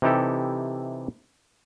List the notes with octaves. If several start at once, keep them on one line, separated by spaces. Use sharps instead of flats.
C3 E3 D#4 E4 G4 A4